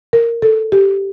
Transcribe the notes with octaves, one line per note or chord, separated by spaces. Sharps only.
A#4
A4
G4